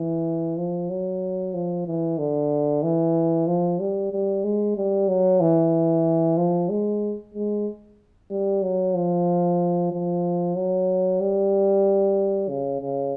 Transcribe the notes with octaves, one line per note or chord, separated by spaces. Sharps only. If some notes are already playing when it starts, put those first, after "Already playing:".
Already playing: E3
F3
F#3
F3
E3
D3
E3
F3
G3
G3
G#3
G3
F#3
E3
F3
G#3
G#3
G3
F#3
F3
F3
F#3
G3
C#3
C#3